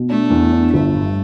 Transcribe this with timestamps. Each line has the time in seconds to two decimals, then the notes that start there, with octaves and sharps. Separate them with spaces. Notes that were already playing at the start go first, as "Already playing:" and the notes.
Already playing: B2
0.09 A3 D4
0.30 E2
0.52 D4
0.73 G1 A3
0.94 G2